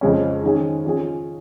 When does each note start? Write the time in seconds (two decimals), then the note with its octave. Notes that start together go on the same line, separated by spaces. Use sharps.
0.01 F2 C#3 G#3 C#4
0.43 D#3 G#3 C#4 G#4
0.85 F3 C#4 G#4